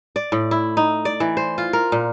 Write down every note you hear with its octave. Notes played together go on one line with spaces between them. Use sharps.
D5
A2
E4
D#4
D5
E3
C5
F4
A#4
A#2